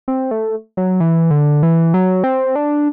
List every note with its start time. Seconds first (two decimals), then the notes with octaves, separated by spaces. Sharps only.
0.08 C4
0.31 A3
0.77 F#3
1.00 E3
1.31 D3
1.63 E3
1.94 F#3
2.24 C4
2.56 D4